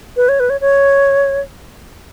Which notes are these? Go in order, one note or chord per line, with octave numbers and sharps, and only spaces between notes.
B4
C#5
B4
C#5
C#5